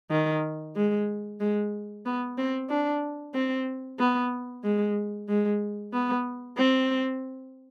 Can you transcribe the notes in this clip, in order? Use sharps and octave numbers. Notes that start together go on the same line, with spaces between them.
D#3
G#3
G#3
B3
C4
D4
C4
B3
G#3
G#3
B3
C4